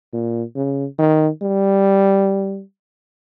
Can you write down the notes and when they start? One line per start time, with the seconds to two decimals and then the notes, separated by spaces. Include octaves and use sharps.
0.13 A#2
0.56 C#3
0.99 D#3
1.42 G3